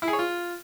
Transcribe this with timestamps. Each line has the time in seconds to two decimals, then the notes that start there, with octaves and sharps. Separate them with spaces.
0.02 E4
0.08 G#4
0.13 C#5
0.19 F4